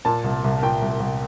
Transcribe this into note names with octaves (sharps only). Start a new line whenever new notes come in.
A#2 A5
C2
C2
A#2 G5
C2
C2